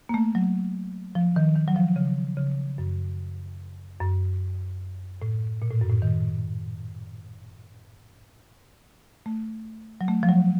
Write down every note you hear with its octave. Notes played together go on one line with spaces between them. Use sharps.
A#3
A3
F#3
F3
D#3
D#3
F#3
F3
C#3
C#3
F#2
F#2
A2
A#2
A2
F#2
A2
D#3
A3
F#3
A3
F3
F#3